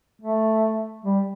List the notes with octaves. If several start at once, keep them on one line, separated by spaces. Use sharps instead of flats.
A3
G3